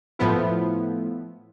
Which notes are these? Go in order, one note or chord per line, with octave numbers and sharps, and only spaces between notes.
A2 F3 B3 E4